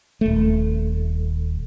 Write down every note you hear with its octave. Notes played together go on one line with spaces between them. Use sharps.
D#1 A3